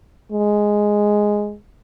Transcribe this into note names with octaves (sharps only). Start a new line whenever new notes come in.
G#3